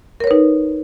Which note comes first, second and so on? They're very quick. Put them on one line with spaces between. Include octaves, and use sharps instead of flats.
A#4 C#5 B4 D#4